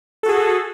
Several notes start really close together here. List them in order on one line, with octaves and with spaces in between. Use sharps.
A4 F#4 G#4